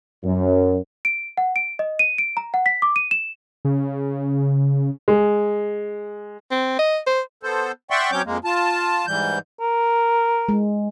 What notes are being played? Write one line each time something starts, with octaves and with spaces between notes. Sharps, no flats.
F#2
D7
F#5
D7
D#5
D#7
D7
A#5
F#5
B6
D6
D#7
E7
C#3
G#3
C4
D#5
C5
B3 A4 C5
D5 E5 F#5 G5 C6 C#6
F#3 C4 C#4 C#5 D6 G6
F2 G#3 A#3
F4 A5
G#2 E3 G3 G6
A#4
G#3